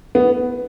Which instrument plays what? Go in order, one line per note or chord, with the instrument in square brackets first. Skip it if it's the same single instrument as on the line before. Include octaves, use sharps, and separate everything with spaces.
[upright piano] B3